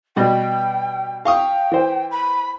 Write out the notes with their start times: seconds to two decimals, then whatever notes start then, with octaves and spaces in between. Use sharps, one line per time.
0.16 B2 G3 F#4 G5
1.25 F5 G5 C#6 D#6
1.72 E3 C5
2.11 B5